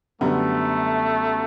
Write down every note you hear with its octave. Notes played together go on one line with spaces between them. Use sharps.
F#2 D3 G3 A3 B3